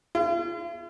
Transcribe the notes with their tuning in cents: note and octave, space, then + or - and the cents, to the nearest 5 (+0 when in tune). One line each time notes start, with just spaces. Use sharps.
F4 -45